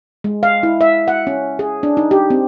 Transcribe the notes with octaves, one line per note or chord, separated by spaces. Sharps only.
G#3
F5
E4
E5
F#5
C#4
G#4
D4
D#4
G4
C4